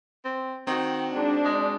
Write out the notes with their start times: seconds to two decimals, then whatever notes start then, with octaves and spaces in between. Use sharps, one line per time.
0.25 C4
0.67 D#3 C4 F#4
1.16 G#2 D4
1.45 G#3